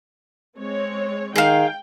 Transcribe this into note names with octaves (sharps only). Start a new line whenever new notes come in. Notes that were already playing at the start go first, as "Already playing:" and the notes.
G#3 C4 C#5
D#3 G#4 F5 G5